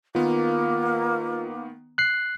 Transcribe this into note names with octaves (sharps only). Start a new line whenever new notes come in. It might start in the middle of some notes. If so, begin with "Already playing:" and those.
D#3 A#3 B3 F4
F#6 C7